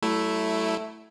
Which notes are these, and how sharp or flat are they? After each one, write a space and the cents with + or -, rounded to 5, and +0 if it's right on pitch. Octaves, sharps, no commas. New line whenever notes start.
F#3 +40 A3 +0 E4 +0